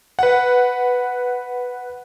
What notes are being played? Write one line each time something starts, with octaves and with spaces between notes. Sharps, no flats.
B4 F#5